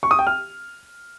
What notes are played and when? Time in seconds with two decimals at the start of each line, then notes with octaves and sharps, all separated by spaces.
0.03 C#6
0.11 D#6
0.19 G5
0.27 F6